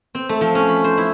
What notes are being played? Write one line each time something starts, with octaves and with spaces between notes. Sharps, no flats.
C4
A3
F3
C#4
B5
C5
E4